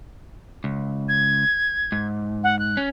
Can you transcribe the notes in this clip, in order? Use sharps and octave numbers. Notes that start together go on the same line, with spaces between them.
C#2
G#6
G#2
F#5
F#6
C#4